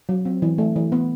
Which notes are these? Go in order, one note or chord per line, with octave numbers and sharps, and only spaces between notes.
F#3
C4
E3
A3
E3
B3